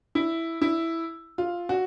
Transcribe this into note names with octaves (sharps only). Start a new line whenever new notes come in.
E4
E4
F4
F#4